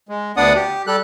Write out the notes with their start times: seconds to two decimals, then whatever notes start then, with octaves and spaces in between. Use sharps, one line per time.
0.09 G#3
0.37 D2 B3 D4 D5 F#5 D#6
0.55 G4
0.87 G3 G4 A4 F#6